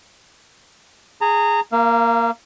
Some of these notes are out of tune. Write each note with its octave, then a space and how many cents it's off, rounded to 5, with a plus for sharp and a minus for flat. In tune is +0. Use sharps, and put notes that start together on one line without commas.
G#4 +0 A#5 -25
A#3 +0 F5 -35